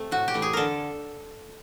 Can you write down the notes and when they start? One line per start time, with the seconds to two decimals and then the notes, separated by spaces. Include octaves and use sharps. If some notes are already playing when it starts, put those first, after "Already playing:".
Already playing: C3 A3 C4
0.11 A2 F#4
0.28 G4
0.34 E3 A3
0.42 G#4
0.53 D3 A4 A#4